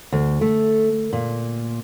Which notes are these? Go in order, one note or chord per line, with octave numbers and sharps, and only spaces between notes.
D2
A3
A#2